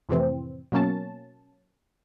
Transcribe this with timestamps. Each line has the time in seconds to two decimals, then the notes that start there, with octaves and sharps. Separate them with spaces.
0.09 F2 A2 C3 E3 C4
0.72 B2 F#3 A#3 C#4 A5